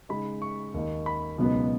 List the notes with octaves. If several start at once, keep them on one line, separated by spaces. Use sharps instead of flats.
C#3 G#3 D#4 B5
C#6
D#2 D#3 A#3 D#4
B5
C#2 B2 F#3 B3 D#4